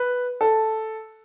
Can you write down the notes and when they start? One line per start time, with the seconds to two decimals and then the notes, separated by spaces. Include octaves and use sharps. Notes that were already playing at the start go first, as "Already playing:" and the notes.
Already playing: B4
0.41 A4